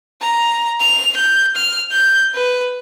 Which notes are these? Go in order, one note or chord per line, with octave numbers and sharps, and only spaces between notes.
A#5
F7
G6
F6
G6
B4